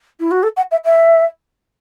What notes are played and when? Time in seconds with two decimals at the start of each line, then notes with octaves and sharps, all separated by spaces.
0.20 E4
0.31 F#4
0.43 A4
0.57 F#5
0.71 E5
0.85 E5